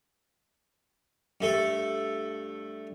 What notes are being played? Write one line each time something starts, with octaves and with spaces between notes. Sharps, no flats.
G2 A3 A4